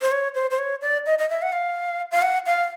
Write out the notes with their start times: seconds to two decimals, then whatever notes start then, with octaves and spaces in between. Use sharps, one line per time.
0.02 C5
0.12 C#5
0.35 C5
0.51 C5
0.59 C#5
0.82 D5
1.06 D#5
1.19 D#5
1.29 E5
1.42 F#5
1.52 F5
2.11 F5
2.22 F#5
2.46 F5